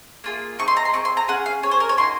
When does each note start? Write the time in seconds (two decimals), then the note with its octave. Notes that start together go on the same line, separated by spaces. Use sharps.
0.24 A#3 F4 G#4
0.59 C4 D#4 G#4 C#6
0.68 C6
0.77 A#5
0.85 C6
0.93 C4 F4 G#4 C#6
1.05 C6
1.17 A#5
1.28 C#4 G#4 F#5
1.46 F5
1.63 C#4 G#4 C#5
1.71 C5
1.80 A#4
1.89 C#5
1.97 A#3 D#4 F#4 C6